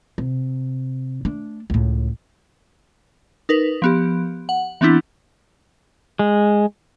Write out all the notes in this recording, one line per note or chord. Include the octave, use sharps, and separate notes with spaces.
C3
A3 D4
C#2 A2
D#4 A#4 B4
F3 B3 G4
F#5
E3 B3 C4 D4 E4
G#3